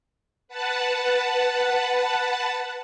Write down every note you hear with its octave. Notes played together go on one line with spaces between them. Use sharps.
B4 F#5 A5